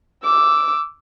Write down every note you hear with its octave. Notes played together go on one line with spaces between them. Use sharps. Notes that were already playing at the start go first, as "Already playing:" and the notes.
D6 E6